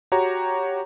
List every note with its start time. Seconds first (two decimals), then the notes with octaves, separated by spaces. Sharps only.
0.12 F#4 G4 C#5 A#5